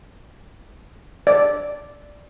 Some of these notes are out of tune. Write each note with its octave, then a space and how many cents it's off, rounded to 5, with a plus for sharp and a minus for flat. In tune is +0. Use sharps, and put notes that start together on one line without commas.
D5 -5